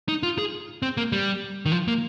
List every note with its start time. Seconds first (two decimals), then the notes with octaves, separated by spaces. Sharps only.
0.08 D#4
0.23 F4
0.38 G#4
0.82 C4
0.97 A#3
1.12 G3
1.66 D#3
1.72 F3
1.88 A#3